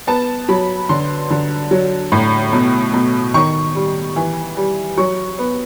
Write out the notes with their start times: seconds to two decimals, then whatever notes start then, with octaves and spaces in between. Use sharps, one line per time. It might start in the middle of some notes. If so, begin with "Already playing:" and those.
0.07 B3 A5
0.49 F#3 B5
0.89 D3 C6
1.30 D3
1.71 F#3
2.12 A2
2.53 B2
2.94 B2
3.34 D#3 C#6
3.75 G3
4.16 E3
4.57 G3
4.98 F#3 C#6
5.39 B3